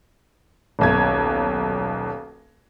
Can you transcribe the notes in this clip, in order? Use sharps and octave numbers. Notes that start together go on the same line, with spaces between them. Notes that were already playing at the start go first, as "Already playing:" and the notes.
D#1 B1 G#6